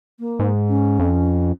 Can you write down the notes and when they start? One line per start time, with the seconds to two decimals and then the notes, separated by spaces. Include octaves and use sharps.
0.20 A#3
0.39 G#2
0.69 C#4
0.99 F2